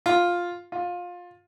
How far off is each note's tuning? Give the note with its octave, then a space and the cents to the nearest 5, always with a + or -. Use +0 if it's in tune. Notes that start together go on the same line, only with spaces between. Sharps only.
F4 +5
F4 +20